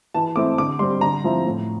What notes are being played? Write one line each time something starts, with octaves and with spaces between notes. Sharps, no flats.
E3 A5
A3 C4 E4 D6
D3 D6
G3 C4 C6
D3 A#5
F3 C4 E4
A2